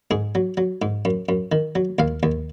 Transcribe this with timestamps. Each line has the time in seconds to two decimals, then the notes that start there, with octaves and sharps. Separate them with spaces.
0.11 G#2 G#4
0.35 F#3
0.57 F#3
0.82 G#2
1.05 F#2
1.29 F#2
1.52 D#3
1.75 F#3
1.99 D#2 F5
2.23 D#2